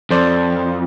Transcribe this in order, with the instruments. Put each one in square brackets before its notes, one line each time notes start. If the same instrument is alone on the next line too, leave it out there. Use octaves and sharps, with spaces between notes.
[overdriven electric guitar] F2 [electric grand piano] A4 C5 D5